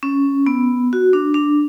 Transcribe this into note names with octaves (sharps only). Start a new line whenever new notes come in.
C#4
B3
F#4
D4
D4